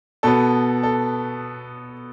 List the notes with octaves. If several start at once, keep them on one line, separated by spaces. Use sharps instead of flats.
B2 B3 A4
A4